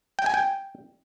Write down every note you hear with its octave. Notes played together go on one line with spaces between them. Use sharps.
G5
G#5
G5